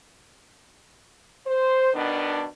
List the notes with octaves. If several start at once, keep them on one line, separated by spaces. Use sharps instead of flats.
C5
B2 D#3 B3 D4